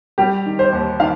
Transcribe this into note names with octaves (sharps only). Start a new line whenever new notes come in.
G3 G4
D#3
C5
D#2
D#3 F5